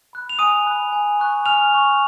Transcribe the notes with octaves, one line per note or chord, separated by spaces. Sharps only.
B5 F#6
F7
G#5 D#6 D#7
B5 F#6
G#5
C#6 F#6
G#5 F6 F7
C#6 F#6